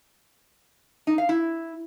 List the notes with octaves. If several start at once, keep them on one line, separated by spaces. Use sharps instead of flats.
D#4
F5
E4